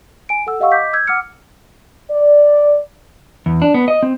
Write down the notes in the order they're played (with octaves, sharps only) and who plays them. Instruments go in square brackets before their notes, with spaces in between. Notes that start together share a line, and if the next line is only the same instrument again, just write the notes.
[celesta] G#5 D7
A4 F#5 E6
G4 D#5 F5 F#5 C#6 E6
D#5 D6 G6 B6
E6 G6 G#6
F#5 D6 E6 F6 C#7
[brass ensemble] D5
[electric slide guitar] E2
D4
B3
D#5
C4